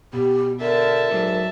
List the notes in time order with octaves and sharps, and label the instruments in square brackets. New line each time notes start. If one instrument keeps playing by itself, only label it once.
[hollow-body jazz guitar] B2 [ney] G4
[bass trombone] D3 [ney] A#4 [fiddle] E5 A5
[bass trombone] G#2 [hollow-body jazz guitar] F#3 D4 A4